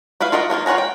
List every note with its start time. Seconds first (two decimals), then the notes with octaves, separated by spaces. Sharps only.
0.21 E4 B4 E5 F5
0.32 F4 F#4 A#4 D#5 E5
0.50 F#3 A#3 D#4 F4
0.66 F4 C#5 F#5 G#5 A#5
0.78 G5